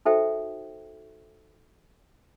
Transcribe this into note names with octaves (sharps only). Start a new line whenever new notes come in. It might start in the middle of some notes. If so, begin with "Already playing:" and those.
D#4 F#4 A4 C5 E5 G5